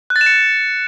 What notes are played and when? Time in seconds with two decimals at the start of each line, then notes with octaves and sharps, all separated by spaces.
0.10 F#6
0.16 A6
0.21 E7
0.26 C#7